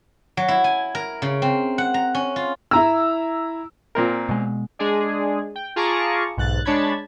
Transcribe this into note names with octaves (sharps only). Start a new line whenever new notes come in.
F#3
E4
G#5
A#4
C#3
C4
F#5
A#5
C#4
F4
E4 A#5 E6
A#2 C4 A#4
B2 G#3
G#3 D4 G#4 D5
G5
F4 G#4 A5 A#5 C#6 D6
B1 G#2 F#6 A6
G#3 D4 C#5 A5 B5 G#6